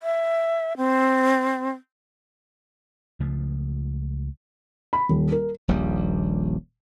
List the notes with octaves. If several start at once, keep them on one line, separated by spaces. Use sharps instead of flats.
E5
C4
C#2 C#3 F3 A3
B5
D#1
A#4
D#1 A#1 D#2 G3